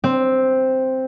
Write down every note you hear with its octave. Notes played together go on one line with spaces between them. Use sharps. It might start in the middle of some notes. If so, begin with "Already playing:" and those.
C4